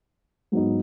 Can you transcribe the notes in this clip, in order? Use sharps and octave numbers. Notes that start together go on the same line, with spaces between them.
G#2 F#3 B3 D#4